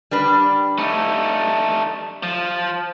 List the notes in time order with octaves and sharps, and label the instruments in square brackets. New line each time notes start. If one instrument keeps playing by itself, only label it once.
[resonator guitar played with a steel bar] G3 D4 B4
[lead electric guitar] A3 D#4
F3